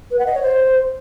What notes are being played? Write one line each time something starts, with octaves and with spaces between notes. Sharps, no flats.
B4
F#5
D#5
C#5
C5